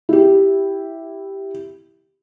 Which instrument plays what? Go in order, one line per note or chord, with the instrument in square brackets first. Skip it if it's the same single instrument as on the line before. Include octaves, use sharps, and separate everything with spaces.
[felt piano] E4 G4